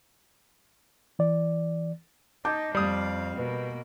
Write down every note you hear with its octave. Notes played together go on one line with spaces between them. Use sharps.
E3 D5
D#4 D#5 A5 D6 G6
F2 G3 F5 D#6
B2 A#3 B3